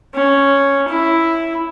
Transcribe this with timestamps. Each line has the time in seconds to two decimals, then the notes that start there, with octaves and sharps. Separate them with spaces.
0.15 C#4
0.89 E4